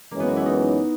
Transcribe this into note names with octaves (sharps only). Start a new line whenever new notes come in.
F#2 E3 G#3 A#3 C#4
B3
F#4
E4
D#4